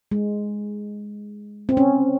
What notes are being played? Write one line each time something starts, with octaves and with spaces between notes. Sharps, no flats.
G#3
C4
C#4